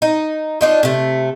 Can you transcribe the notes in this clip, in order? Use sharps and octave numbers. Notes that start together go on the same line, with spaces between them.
D#4
D4 D#4 F4
C3 A3